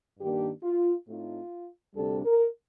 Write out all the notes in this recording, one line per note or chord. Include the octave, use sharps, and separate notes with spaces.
G2 D#3 A#3 D4 G4
F4
A2 A3 C4 D#4 F4
D2 C3 G3 D4 A4
A#4